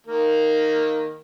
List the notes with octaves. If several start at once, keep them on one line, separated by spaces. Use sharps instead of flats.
D#3 A#3 A#4